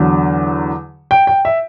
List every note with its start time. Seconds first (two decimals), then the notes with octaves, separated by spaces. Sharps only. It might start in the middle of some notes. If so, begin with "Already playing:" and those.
Already playing: E2 D3 F#3
1.11 G5
1.27 G5
1.45 E5